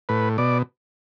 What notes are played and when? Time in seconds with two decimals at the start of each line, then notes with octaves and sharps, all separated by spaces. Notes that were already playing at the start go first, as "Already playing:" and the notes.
0.09 A2 B4
0.38 B2 D5